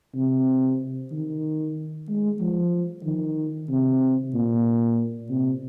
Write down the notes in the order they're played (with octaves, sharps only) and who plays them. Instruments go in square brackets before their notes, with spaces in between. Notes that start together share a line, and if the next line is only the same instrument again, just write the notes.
[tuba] C3
D#3
G#3
F3
D#3
C3
A#2
C3